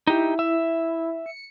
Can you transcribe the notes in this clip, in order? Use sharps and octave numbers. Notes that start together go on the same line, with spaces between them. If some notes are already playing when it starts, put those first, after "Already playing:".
D#4 E4 G4
E5
C#7